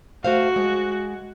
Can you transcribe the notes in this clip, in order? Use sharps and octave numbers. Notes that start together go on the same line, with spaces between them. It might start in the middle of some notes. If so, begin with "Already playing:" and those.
A3 F#4 C5 F5
G#3